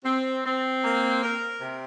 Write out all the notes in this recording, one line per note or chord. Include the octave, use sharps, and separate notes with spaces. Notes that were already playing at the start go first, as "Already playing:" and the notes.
C4
C4
A#3
A#4
C3